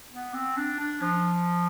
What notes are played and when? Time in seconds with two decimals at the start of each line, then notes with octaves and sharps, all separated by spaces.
0.12 B3
0.34 C4
0.57 D4
0.79 D4
1.02 F3